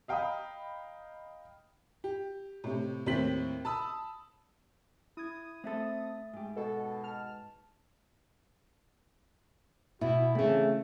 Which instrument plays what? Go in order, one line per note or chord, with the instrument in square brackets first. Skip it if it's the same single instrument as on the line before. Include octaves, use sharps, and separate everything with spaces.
[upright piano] D#5 F5 G5 A#5 B5 D#6
[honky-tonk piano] G4
A2 C3
D#2 A2 C4 C5 B6 F#7
A5 B5 D#6 E6
[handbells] E4 G#6 [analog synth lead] D#6
[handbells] A3 E5 A6 [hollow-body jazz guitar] C4 A4
[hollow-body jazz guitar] G#2 G4
[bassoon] B2 [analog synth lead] A4
[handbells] A5 [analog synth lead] F6
[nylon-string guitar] B2 [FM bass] E4 [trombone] F#4 [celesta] E5
[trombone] C#3 [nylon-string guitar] E3 C4 [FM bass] A3 [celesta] E5